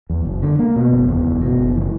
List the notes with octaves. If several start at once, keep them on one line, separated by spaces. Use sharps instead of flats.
E2
F#1
D3
A#3
B2
F#1
E2
F#1
B2
F#1
E3